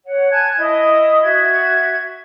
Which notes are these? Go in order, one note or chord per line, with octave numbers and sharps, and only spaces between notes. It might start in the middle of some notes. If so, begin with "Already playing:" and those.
C#5 F#5
G#5 A5 F#6 G#6
E4 D#5 D#6
F#4 E5 G#6